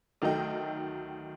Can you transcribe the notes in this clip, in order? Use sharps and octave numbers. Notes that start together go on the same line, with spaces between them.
D2 D#3 F#3 A4 D#5 G5